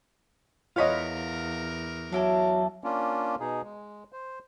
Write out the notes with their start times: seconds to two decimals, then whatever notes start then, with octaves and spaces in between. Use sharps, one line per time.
0.76 E2 F4 A#4 C#5 D#5 F5 F#5 B5
2.12 F#3 D4 E4 A4
2.84 A#3 C#4 D4 F4
3.40 B2 D#4 G#4
3.64 G#3
4.12 C5